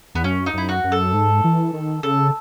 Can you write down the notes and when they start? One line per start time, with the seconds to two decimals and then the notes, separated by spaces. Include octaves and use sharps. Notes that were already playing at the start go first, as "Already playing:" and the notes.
0.15 E2 B3
0.24 F#2 C#4
0.46 D#4
0.54 F#2 E4
0.69 F#4
0.84 F#2
0.92 A4
1.14 G#2
1.44 E3
1.73 D#3
2.03 C#3 A4